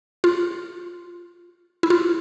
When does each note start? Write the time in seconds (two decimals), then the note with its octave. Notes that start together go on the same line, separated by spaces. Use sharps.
0.24 F4
1.83 E4
1.90 F4